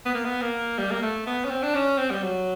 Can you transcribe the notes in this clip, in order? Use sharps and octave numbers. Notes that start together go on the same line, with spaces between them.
B3
A#3
B3
A#3
G3
A#3
A3
B3
C#4
C4
D4
C#4
C4
G3
F#3